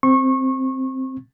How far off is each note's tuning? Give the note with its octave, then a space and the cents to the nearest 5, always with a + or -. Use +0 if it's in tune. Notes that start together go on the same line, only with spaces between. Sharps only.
C4 +0 C#6 -25